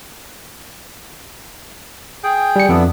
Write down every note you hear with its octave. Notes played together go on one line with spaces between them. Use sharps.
G#4 G5
G3 C#7
F2 B3 D4 E4